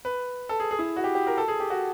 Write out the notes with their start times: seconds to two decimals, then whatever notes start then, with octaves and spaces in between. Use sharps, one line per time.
0.05 B4
0.49 A4
0.60 G#4
0.71 G#4
0.79 E4
0.96 F#4
1.04 G4
1.15 G4
1.27 A#4
1.38 A4
1.48 G#4
1.60 G4
1.70 F#4